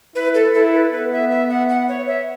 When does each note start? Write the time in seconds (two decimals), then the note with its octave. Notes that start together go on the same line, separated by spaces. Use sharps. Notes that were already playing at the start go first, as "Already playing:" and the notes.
0.15 E4 B4
0.35 A4
0.54 E4 A4
0.73 B4
0.92 B3 B4
1.12 E5
1.31 E5
1.50 F#5
1.69 F#5
1.88 C#5
2.08 E5